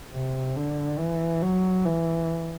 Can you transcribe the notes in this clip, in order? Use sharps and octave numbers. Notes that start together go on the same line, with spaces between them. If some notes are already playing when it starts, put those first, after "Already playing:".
C3
D3
E3
F#3
E3